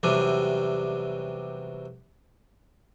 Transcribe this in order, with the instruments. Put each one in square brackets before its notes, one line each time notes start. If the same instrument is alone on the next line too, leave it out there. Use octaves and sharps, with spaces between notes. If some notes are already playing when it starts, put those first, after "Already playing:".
[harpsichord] E2 C3 E3 F#3 G3 D4